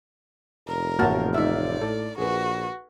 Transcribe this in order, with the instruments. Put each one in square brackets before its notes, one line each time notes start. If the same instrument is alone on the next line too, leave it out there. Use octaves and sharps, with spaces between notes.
[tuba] F1 [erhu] A#4
[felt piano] A1 F6 [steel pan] A#3 F#4 A5
[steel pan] D#4 E5 [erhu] D5
[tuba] A2 [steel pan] A4
[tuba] A#1 [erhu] F#4 [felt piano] G#4 B4